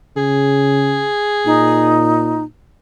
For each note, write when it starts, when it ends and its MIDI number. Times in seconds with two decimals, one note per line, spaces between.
0.17 1.09 49
0.17 2.09 68
1.46 2.44 46
1.46 2.43 63